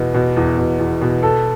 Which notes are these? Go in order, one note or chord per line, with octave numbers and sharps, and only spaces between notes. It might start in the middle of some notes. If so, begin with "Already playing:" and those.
Already playing: E2 B2 B3
B2
E2
B2
E2
B2
A4